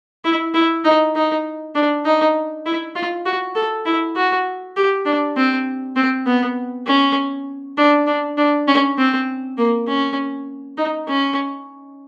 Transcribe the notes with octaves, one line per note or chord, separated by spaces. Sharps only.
E4
E4
D#4
D#4
D4
D#4
E4
F4
F#4
A4
E4
F#4
G4
D4
C4
C4
B3
C#4
D4
D4
D4
C#4
C4
A#3
C#4
D#4
C#4